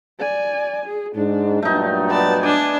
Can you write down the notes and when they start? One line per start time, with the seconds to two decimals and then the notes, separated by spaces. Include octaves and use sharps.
0.20 D5 G#5
0.86 G#4
1.15 G#2 D4
1.62 G2 A#2 F#3 A3 D#4
2.10 B3 D5 A5
2.43 D4 D5 G#5